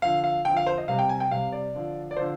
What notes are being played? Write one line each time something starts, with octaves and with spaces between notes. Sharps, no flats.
D3 F3 F5
F5
D3 G5
F3
F5
C5
D#5
C3 G3 F5
G5
G#5
G5
C3 G3 F5
D5
D3 F3
D5
D3 F3 C5